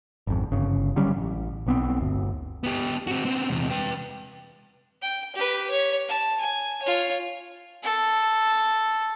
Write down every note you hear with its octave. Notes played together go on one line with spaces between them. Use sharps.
G#1 F2
G1 C#3
D3 F#3 G3 C#4
A1
B1 B3 C4
G1 D2
B3 G4
C4 F#4
B3 C4
E2 C3
B4 G5
G5
G4 B4
C#5
A5
G#5
F4 C#5
A4